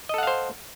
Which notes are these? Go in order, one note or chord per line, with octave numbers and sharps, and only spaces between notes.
A4 C5 D#5 F5 F#5